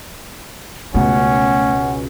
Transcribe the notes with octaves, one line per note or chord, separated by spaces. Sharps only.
C#2 B2 A3 C#4 F4 F#5